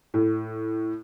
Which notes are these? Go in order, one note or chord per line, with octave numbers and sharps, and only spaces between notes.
A2